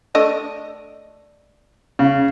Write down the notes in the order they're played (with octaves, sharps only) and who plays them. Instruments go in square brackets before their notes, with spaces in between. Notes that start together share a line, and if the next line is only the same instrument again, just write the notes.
[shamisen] A3 D4 D#5
[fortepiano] C#3